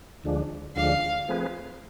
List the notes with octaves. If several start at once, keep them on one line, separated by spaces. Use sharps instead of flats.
D2 D3 F3 G#3 D4
D2 D3 F3 G#3 D4 F5
F3 A3 C4 G#4 B4